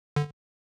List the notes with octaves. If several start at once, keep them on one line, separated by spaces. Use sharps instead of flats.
D3